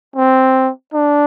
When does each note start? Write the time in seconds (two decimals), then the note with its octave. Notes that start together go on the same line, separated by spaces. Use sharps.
0.16 C4
0.94 D4